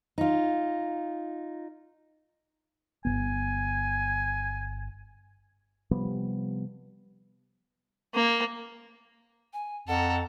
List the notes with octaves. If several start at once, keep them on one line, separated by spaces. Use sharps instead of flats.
D#4 F4
G1 E2 B3 G#5
C3 F3 G3 B3
A#3
G#5
F2 A4 F#5 A#5